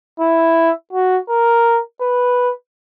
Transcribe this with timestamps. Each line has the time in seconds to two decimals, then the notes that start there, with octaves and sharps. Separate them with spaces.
0.20 E4
0.93 F#4
1.29 A#4
2.01 B4